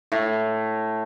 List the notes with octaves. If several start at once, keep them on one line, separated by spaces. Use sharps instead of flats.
A2